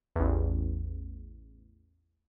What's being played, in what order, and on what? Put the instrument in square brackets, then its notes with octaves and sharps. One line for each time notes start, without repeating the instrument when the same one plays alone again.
[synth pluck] A1 E2